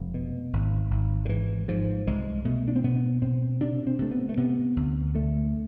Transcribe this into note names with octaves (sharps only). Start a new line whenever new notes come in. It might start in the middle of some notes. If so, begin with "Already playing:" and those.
Already playing: F1 G#3
B2
G#1
G#1
D3
G#2 E3
G#2 F3
C2 G#3
B2 A3
D4
C4
B2 B3
B2 C4
C3 D4
C4
C3 A3
B3
A3
C3 B3
D2
D3 A3